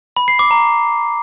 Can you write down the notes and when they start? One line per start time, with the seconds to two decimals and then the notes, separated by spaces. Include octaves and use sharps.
0.17 B5
0.28 C7
0.39 D6
0.51 A#5